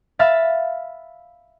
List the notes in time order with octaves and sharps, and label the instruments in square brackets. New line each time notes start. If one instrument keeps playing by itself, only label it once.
[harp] E5 F5 B5 E6 A6 B6